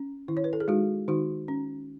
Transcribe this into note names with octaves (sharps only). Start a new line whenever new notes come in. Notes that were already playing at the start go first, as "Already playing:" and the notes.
Already playing: C#4
D#3 E4
C#5
B4
A4
G#4
G#3 D#4 F#4
D#3 D#4 F#4
C#4